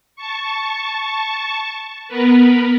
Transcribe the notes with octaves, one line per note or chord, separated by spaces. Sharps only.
A5 C#6
B3 A#4 B4